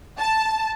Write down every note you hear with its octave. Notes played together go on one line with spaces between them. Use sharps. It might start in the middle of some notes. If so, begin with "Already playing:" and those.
A5